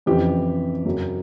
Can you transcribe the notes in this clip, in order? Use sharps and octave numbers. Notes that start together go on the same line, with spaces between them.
F2 C#3 E3 G4
F#2 C#3 F#3